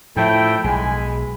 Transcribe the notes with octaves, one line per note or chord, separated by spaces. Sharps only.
A2 F3 A3 E4 G5
B1 G#3 G#5 B5